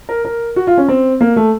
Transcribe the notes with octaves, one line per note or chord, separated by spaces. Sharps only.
A#4
A#4
F#4
F4
C#4
C4
A#3
A3